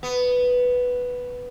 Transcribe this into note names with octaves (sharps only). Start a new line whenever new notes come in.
B3